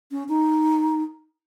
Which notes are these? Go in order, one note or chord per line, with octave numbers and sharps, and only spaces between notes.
C#4
D#4